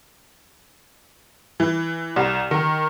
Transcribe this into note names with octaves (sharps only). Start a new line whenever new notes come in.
E3
C2
D#3